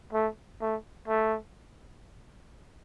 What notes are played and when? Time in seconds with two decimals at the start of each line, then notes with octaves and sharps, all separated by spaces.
0.13 A3
0.61 A3
1.08 A3